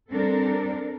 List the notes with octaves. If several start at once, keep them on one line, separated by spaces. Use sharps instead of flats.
G3 C4 D4 A4 A#4